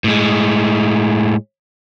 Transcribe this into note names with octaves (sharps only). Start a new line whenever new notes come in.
A2 G#3